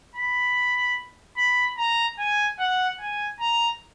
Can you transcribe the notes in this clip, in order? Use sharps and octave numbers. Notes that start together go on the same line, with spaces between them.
B5
B5
A#5
G#5
F#5
G#5
A#5